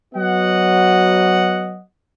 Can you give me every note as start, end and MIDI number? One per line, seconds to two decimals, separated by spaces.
0.14 1.79 54
0.14 1.79 59
0.14 1.79 66
0.14 1.79 75
0.14 1.79 78